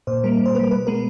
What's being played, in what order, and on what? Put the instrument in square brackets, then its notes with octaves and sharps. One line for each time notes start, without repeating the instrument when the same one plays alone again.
[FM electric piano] A#2 C5
G3 A#3 A#4
A#2
C5
G3 A#3 B4
B2 B4
G#3 B3 A#4